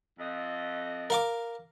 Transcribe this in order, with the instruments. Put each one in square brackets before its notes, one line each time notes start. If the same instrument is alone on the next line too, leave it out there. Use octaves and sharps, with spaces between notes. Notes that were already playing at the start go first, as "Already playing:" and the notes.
[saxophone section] F2 D#5
[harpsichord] A#4 F5 D6